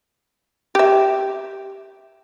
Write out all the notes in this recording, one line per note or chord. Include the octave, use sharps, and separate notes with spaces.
G4 E5